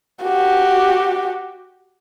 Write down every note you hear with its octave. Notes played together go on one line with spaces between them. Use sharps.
F#4 G4